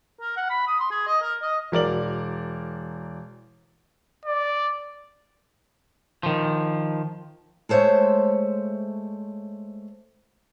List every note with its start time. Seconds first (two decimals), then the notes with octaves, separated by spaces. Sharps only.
0.21 A#4
0.37 F#5
0.50 B5
0.67 D#6
0.80 C6
0.91 G#4
1.07 D#5
1.22 A#4
1.42 D#5
1.72 E1 A#4 D5 F#7
4.26 D5
6.23 D#3 F3
7.69 G#3 A3 C5 C#5 E5